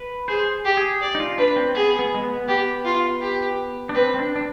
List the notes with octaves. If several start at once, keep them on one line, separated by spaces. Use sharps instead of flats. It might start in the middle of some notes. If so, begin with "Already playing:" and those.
Already playing: B4
G#4 C5
G4
G#4
D5
D#4
F4
D4 B4
C4
B3 G#4
B3
G#3
B3
B3 G4
F4
G4
D4
C4 B4
C4
D4
D4